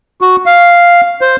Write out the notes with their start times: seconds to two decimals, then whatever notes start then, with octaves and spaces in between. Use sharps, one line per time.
0.21 F#4
0.46 F5
1.21 C5